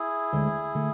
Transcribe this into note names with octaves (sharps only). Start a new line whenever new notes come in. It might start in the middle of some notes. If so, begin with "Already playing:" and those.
Already playing: E4 G#4
D2 D3 G#3
D3 A3